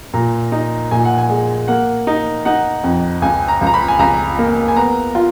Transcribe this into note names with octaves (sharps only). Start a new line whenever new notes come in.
A#2 A#5
D#4
A#2 G#5
F#5
G#5
G#3
A#3 F#5
D#4
D#4 F#5
F2
C#2 G#5
A#5
C#2
A#5
B5
G#5
C#2 A#5
A#3
G#5
B3 A#5
F4